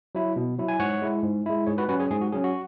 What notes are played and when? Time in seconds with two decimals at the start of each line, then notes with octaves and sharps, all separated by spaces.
0.15 F#3 E4
0.36 B2
0.58 F#3 E4
0.68 G#5
0.79 G#2 C#5 F#5
1.02 G#3 E4
1.23 G#2
1.46 G#3 E4
1.67 G#2 G#4 C#5
1.78 F#4 B4
1.89 F#3 C#4 F#4 B4
1.99 G#4 C#5
2.10 G#2 G#4
2.21 F#4
2.32 F#3 C#4 G#4
2.44 F#4